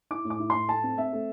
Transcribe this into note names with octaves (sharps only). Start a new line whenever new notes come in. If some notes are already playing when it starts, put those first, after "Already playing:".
E4 D6
A2
D6
E4
A2 C6
A3 A5
C4
C4 E5
A3